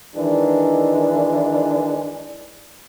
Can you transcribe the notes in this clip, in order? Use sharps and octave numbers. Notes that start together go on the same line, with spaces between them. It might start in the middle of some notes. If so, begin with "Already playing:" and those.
D#3 E3 G#3 D4